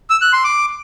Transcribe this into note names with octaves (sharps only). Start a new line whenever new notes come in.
E6
F#6
C6
D6